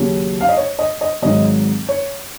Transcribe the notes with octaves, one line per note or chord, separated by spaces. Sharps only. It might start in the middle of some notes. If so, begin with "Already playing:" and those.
Already playing: D#2 C#3 F#3
F5
D#5
C#5
D#5
D#5
G#1 G#2 D#3 F#3 D#5
C#5